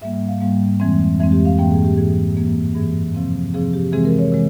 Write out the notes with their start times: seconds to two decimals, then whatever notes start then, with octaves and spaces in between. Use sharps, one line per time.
0.01 G#2 G3 A#3 E5
0.14 E5
0.28 F5
0.41 G#2 G3 A#3 F5
0.80 F2 E3 G#3 C4
1.19 F2 E3 G#3 C4 E5
1.32 G4
1.45 F5
1.58 G#2 E3 A#3 G5
1.71 G#4
1.85 G4
1.97 G#2 E3 A#3 G#4
2.36 G2 E3 A#3
2.75 G2 E3 A#3 G#4
3.15 C3 F3 C4
3.54 C3 F3 C4 G#4
3.74 G4
3.92 C3 E3 G#3 C4 G#4
4.05 A#4
4.19 C#5
4.32 C3 E3 G#3